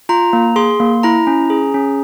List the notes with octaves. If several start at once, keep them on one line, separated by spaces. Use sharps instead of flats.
F4 A#5
A#3
G#4 C6
A#3
E4 A#5
C#4
G#4
C#4